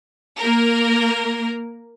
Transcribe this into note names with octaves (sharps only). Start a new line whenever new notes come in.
A#3 A#4